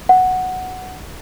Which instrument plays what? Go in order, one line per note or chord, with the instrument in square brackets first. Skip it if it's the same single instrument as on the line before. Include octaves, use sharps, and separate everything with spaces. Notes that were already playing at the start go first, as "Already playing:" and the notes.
[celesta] F#5